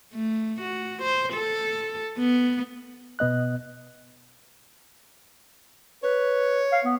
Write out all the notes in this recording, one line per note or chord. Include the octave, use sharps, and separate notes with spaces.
A3
F#4
C5
A4
B3
B2 B3 D#5 F#6
B4 C#5
F5
B3